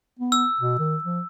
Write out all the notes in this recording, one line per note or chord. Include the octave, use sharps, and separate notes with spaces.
B3
E6
B2
D#3
F3